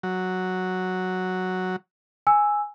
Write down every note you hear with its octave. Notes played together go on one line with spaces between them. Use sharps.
F#3
G#5 E6